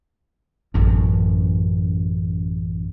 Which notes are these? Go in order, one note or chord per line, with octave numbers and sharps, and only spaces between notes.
A1 F#2